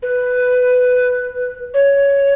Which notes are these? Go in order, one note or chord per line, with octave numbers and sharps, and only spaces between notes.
B4
C#5